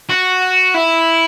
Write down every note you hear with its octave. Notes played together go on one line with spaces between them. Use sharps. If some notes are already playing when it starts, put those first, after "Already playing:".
F#4
E4